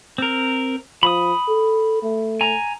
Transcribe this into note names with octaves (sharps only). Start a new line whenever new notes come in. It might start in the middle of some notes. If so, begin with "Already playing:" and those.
C4 A#4
F3 B5 D#6
A4
A3
G#5 A#5